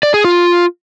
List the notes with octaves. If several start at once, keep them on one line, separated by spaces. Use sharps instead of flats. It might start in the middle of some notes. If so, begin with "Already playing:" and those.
D5
G#4
F4